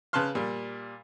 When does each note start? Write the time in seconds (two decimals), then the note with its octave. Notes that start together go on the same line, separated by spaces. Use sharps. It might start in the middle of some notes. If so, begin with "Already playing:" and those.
0.13 C#3 B4 A5 C6 F6
0.35 A#2 G3